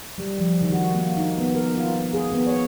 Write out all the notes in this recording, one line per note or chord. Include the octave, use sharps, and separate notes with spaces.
G3
F3
D#3
F#4
A#3
D#4
B3
A#4
F4
G#4
B3
C#5